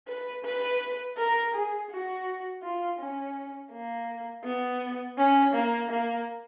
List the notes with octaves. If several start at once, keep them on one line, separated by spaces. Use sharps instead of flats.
B4
B4
A#4
G#4
F#4
F4
C#4
A#3
B3
C#4
A#3
A#3